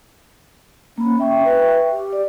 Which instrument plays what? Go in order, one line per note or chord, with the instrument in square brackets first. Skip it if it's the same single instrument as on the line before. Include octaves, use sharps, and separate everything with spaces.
[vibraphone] A#3 B5 [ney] C#4
[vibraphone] E5 G5 C#6
[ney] B4
G4
[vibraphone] D5